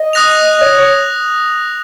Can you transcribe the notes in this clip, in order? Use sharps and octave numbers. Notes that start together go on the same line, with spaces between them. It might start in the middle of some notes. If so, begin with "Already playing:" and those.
Already playing: D#5
D#6 F#6 A#6 F7
C#5
C#5